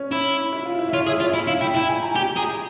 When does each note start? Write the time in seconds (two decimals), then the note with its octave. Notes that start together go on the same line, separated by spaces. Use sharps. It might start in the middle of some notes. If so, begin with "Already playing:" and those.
Already playing: C#4
0.11 E4
0.53 E4
0.66 F4
0.79 E4
0.89 E5
0.93 F4 C#5
1.06 G#4 E5
1.20 F4 C#5
1.34 E4 E5
1.48 E4 F5
1.61 E4 G5
1.75 E4 G5
1.89 G#5
2.03 A#5
2.16 G4 G#5
2.36 G#4 A#5